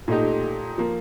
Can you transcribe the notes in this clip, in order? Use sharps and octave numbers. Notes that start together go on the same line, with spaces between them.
A#2 A3 D#4 G4
F3 A#3